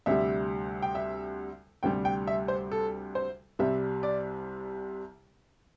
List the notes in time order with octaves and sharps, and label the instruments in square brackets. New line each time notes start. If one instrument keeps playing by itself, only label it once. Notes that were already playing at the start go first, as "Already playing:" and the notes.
[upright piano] D2 C3 G3 E5
G5
E5
D2 C3 G3 G5
G5
E5
C5
A4
C5
C2 C3 G3 E5
D5